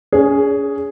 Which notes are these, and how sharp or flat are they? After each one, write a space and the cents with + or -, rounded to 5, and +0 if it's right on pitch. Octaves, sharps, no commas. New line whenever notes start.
C#4 +35 G#4 +0